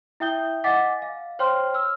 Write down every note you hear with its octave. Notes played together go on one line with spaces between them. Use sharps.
E4 E5 G5 D#6 G6 G7
D#5 F#5 G#5 D6 A6 B6
F5
C5 C#5 G5 C6 F6
E6 F6